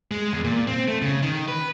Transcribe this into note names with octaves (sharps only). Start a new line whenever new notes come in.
G#3
E2
A#2
C4
A3
C#3
D#3
B4